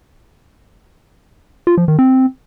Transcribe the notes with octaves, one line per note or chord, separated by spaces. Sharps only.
F4
F3
D#3
C4